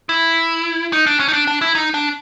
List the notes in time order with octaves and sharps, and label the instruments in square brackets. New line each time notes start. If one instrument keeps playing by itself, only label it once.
[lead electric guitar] E4
D#4
D4
C#4
D#4
D4
D4
E4
D#4
D4